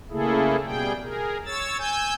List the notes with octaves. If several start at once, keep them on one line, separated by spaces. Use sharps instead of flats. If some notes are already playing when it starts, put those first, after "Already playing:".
C#3 A3 A#3 E4 G#4 A4
B2 G3 G#4 G5
G#4 A#4
C#5 E6 A6
G#5 E6 G6